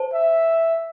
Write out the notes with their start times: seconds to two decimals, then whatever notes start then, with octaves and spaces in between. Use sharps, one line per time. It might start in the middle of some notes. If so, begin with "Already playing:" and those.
Already playing: C5 A5
0.14 E5